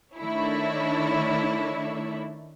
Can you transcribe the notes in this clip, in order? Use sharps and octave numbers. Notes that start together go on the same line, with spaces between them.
D#3 A3 D4 E4 C#5